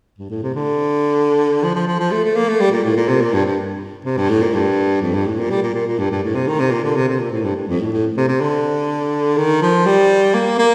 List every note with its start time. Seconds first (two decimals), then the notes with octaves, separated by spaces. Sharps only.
0.18 G2
0.30 A2
0.43 C3
0.55 D3
1.63 F3
1.75 F3
1.87 F3
2.00 F3
2.12 A3
2.24 A3
2.36 A#3
2.48 A3
2.60 G3
2.72 A#2
2.84 A2
2.96 A#2
3.08 C3
3.21 A#2
3.33 G2
3.45 G2
4.05 C3
4.17 G2
4.29 A2
4.42 A#2
4.54 G2
5.02 F2
5.14 G2
5.26 A2
5.38 A#2
5.50 G3
5.63 A#2
5.75 A#2
5.87 A#2
5.99 G2
6.11 G2
6.23 A2
6.35 C3
6.47 D#3
6.60 C3
6.71 A#2
6.83 D3
6.96 C3
7.08 C3
7.20 A#2
7.32 A2
7.44 G2
7.56 G2
7.68 F2
7.80 A2
7.93 A2
8.17 C3
8.28 C3
8.41 D3
9.37 D#3
9.62 F3
9.86 G3
10.34 A#3
10.58 A#3